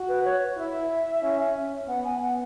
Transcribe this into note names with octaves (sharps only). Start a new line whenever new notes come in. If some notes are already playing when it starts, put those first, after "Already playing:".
Already playing: F#4
B4
C#5
E4 E5
C#4
C#4
B3 F#5
G#5
F#5